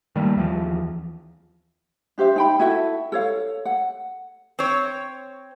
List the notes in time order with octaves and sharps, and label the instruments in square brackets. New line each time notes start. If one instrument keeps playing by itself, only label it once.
[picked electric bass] D#3 G3 A3 A#3
D#2 E3 F3
[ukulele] D4 G4 C5 E5
D#4 G5 B5
E4 F#4 A4 E5
A4 C#5 F5
F#5
[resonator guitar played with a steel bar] C4 C#5